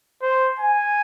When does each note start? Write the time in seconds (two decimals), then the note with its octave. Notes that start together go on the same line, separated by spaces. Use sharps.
0.22 C5
0.59 G#5